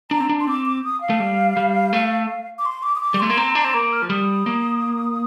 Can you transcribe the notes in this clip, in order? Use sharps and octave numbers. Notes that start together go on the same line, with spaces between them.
D4 A#5
C4
D4
C6
C4 D6
D6
D#6
F5
A3
G3
G3
A3
D6
C6
D6
D#6
D6
G3
A3 C6
A#3
C4 A#5
C6
D4 A#5
C4
A#3 D6
F6
F3
G3 D#6
A#3